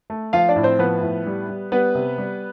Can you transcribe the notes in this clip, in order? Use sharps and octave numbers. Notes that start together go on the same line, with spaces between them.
A3
F3 F4 F5
D4 D5
A2
C4 C5
F3 B3 B4
A2
G3
G3
G3 B3 B4
C3
G3